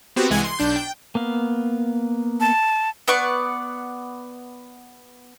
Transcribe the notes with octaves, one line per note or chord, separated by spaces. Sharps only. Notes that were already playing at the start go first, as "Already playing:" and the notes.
B3 C4 F#4 G4
C2 E3 G#3 F#5 G#5 G#6
C6
B1 D4 G6
G5
A#3 B3 F5
A5
B3 D5 F#5 C#6